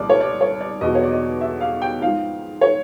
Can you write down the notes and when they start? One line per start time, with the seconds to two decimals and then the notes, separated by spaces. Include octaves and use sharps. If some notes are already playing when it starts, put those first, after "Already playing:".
Already playing: C2 A#2 F3 D5
0.10 C#5
0.20 D5
0.41 C#5
0.60 D5
0.81 E2 B2 F#3 D#5
0.95 C#5
1.03 D5
1.11 D#5
1.41 E5
1.61 F5
1.82 G5
2.02 G#2 F3 F5
2.61 C#5